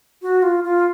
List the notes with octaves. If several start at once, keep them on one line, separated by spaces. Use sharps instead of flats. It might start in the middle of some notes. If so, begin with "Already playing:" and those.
F#4
F4
F4